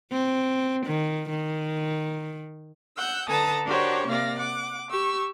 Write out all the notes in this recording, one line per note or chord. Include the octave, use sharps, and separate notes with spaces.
C4
D#3
D#3
F#5 E6 G6
D3 A4 B4 A5 A#5 D#6
D4 F#4 G4 A#4 C5 C#5
C3 A#3 D5 F5 A#6
F#5 D6
G4 C#6 E6